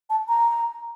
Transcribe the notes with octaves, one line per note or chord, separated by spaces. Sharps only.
A5
A#5